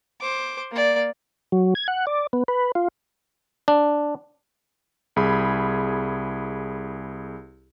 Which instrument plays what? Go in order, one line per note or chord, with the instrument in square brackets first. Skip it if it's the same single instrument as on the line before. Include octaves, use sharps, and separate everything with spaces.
[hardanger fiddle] C5 D6
A#3 D5
[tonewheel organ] F#3
G#6
F#5
D5
B3
B4
F4
[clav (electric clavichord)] D4
[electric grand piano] C2 G#4 B5